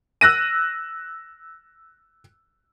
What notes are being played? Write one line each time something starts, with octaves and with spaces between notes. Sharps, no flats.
E6 F#6 A#6 D#7